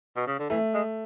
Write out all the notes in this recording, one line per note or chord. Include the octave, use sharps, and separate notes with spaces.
B2
C#3
D3
E3 A3
G#3